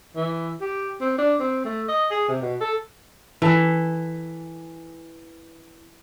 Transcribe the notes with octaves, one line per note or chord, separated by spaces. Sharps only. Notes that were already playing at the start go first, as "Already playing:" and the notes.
E3
G4
C4
D4
C4
A3
D#5
G#4
C3
B2
A4
E3 A4